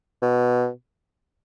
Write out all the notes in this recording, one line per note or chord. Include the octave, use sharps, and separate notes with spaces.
B2